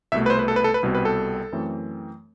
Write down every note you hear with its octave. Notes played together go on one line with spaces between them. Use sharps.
C2 B2 A3 E5
B4
C5
B4
A4
B4
A4
B4
C2 B2 G3 C4
B4
A4
F#2 E3 A3 C4